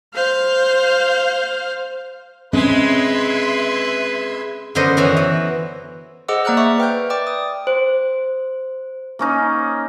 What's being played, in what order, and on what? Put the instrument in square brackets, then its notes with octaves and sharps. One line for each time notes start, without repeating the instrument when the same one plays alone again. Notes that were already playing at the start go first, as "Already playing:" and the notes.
[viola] C5 F5
[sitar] G#3 [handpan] C4 C#4 [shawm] B4 [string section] E5 C6 G#6
[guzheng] F#2 D3 B3 C5 D#5
E3 F#3 F#4
E3
[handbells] G#4 C5 D#5 F#5 D6 E6
A#3 D5 A#5 D6 F6 F#6
D5 E5 C#6
B4 G5 F6 G6
D5 G5 D6
D#6
[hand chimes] C5
[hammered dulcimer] A#3 C#4 D#4